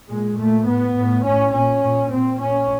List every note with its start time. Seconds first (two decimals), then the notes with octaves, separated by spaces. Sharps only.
0.09 A#2 G#3
0.39 A#2 A3
0.67 A2 B3
0.96 A2
1.25 A2 C#4
1.54 A#2 C#4
1.83 A#2
2.11 A#2 C4
2.40 A#2 C#4